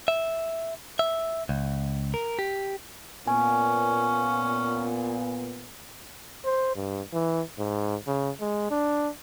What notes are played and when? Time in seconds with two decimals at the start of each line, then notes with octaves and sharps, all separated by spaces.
0.08 E5
0.99 E5
1.49 C#2
2.14 A#4
2.39 G4
3.27 A#2 B3 C#4 G#5
6.45 C5
6.76 G2
7.13 E3
7.59 G#2
8.07 C#3
8.41 G#3
8.71 D4